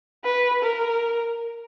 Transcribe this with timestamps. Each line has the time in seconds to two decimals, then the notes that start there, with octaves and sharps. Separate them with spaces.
0.25 B4
0.63 A#4